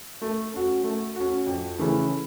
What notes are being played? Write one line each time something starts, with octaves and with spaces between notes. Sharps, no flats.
A3
C#4 F#4
A3
C#4 F#4
F2
C#3 E3 A3 C#4